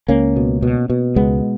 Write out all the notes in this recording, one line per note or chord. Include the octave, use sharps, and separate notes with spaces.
C#2 A#3 C#4
B2
B2
B2
C#2 G#3 B3